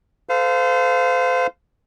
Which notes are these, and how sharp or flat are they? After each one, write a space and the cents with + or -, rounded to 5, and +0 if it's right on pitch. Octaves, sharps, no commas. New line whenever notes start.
A4 +0 C5 -30 F5 +0